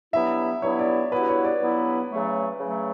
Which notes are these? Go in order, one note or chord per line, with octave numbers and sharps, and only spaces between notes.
G2 F#3 B3 E4 E5
G2 F#3 B3 E4 C#5
D5
G2 F#3 B3 E4 B4
C#5
D5
G2 F#3 B3 E4
C#3 F#3 A3
C#3 F#3 A3